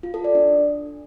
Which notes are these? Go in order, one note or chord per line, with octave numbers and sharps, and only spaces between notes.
F4
A4
D5
D4